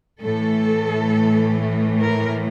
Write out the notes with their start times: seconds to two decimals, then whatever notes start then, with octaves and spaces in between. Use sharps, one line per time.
0.22 A2 E3 A3 A4
2.00 A#4